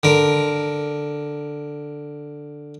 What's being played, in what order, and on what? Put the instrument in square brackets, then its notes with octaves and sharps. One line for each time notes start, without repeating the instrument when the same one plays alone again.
[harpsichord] D3 A#4